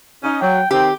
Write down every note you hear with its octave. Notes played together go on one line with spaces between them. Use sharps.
C#4 D#4
F#3 G5
D#3 C4 G4 G5